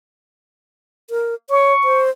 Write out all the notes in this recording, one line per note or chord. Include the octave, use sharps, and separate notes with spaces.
A#4
C#5 C#6
C5